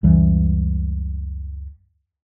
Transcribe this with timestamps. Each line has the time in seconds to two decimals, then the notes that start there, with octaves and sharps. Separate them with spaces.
0.03 C#2 F#2 E3 G3